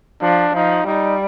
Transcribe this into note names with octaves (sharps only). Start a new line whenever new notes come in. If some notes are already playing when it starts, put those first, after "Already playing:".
F3 D4
F3 D#4
G3 D#4